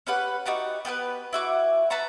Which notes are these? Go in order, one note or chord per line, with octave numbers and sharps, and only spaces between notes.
C#4 G4 B4 F#5
D#4 F#4 G4 B4
B3 G4 A#4 B4
E4 F#4 D6
B4 A5 A#5 C#6